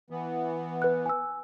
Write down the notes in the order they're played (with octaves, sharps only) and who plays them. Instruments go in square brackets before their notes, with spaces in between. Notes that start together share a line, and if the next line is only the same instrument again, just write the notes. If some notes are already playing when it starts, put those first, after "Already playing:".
[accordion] E3 B3
[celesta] B4 F#6
G#5 E6